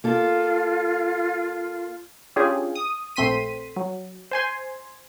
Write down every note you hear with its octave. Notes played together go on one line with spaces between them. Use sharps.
A#3 F4 A4
C#4 D4 F4 G4 G#4
D#6
A#1 A3 C4 C6 B6 D#7
F#3
C5 G#5 C6